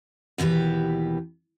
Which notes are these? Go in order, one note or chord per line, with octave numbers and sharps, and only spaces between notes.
D#2 B2 E3 G4 B4